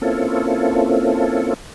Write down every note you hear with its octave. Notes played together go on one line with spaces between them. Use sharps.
A#3 C4 C#4 E4 F4 A4